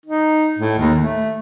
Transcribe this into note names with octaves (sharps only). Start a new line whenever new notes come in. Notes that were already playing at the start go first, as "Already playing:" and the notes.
D#4
A2
D#2
A3